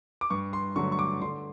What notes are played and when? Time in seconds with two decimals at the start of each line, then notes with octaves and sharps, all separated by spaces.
0.21 D6
0.30 G2 C#6
0.53 C6
0.76 D3 F#3 A3 C#6
0.92 C#6
0.99 D6
1.21 D3 C6